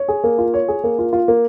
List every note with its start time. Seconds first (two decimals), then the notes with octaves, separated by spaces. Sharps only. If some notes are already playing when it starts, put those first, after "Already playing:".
Already playing: C#5
0.08 G#4
0.24 A#3
0.38 F4
0.54 C#5
0.68 G#4
0.84 A#3
0.99 F4
1.13 F4
1.28 A#3